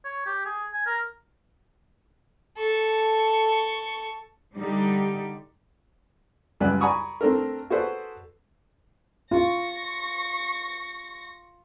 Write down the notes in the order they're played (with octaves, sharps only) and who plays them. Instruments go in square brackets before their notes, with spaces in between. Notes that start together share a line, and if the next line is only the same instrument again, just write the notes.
[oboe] C#5
G4
G#4
G#5
A#4
[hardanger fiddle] A4 C#6
[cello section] D3 G3 D#4 G4 D5
[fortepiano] C#2 F#2 G3 B4 D5 F#6
D5 G#5 A#5 B5 C#6 D#6
A3 C4 D4 A4 A#4
F#4 G#4 A4 B4 C5 D5
[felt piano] F4 [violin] C#6 A#6